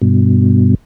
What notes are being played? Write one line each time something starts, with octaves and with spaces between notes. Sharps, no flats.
G2 B2